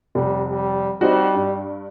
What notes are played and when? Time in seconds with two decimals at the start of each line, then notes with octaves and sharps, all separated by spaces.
0.15 F1 G3
0.50 G3
1.01 G3 C4 D#4 F#4
1.34 G2